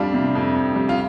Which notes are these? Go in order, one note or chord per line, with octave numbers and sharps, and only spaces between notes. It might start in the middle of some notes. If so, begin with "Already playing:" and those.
Already playing: F2 G3 D4 F4
C3
F2
F2
G3
F4